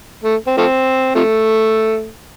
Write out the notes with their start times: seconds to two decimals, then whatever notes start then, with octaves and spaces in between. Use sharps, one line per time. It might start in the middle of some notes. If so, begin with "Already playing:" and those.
0.24 A3
0.47 C4
0.57 F3 A3 C4
1.15 C3 F3 A3